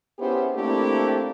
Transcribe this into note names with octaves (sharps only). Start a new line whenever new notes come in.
B3 C#4 E4 G4 G#4 C5
A3 A#3 C4 D4 E4 G4